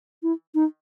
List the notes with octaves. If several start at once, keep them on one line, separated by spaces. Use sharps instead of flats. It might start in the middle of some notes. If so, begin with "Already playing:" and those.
E4
D#4